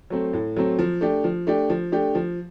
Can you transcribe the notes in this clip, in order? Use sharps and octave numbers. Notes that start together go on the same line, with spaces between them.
F#3 A3 C4
A2
F#3 A3 C4
F3
A3 D4 G4
F3
A3 D4 G4
F3
A3 D4 G4
F3